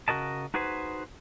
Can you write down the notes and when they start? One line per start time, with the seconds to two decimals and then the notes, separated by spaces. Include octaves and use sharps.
0.08 C#3 F#4 A#4 D#5 A5
0.54 D#4 F#4 G#4 B4 C5